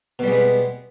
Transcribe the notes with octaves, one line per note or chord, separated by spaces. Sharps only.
B2 G3 G#3 B3